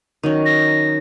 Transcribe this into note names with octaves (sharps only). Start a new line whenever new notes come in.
D#3 F#3 C#4
A#6